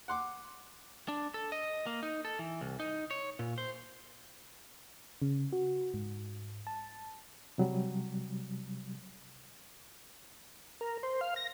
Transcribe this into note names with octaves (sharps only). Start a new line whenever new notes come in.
F#5 C6 D6
D4
A4
D#5
A#3
D#4
A4
E3
C2
D#4
C#5
A#2
C5
C#3
F#4
G#2
A5
C3 F#3 G3
A#4
C5
F5
A#6